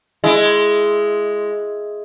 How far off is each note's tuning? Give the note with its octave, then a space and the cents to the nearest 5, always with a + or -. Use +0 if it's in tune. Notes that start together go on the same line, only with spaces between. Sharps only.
G#3 +5 E4 +20